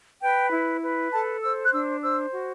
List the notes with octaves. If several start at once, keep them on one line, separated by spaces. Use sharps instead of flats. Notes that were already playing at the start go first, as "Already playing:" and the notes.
B4 G5
E4
B4
A4 A5
C5 E6
F#6
D4 E6
C5 E6
F#4